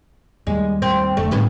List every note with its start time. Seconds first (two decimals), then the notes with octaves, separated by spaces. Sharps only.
0.47 D#2 G3 G#3
0.82 C4
1.17 F1 D3 A3
1.31 D2 A2 G3 G#3 B3 C#4